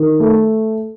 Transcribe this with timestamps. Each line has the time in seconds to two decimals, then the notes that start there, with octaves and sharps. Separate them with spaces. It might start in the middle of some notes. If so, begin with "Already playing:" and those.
Already playing: D#3
0.20 A3